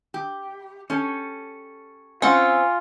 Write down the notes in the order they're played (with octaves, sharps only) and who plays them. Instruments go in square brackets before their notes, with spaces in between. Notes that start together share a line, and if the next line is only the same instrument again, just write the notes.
[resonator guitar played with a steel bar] G4
C#4 G4 A4
[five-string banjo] C4 F#5 [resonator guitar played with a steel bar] C#4 [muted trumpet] F4 [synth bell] G#5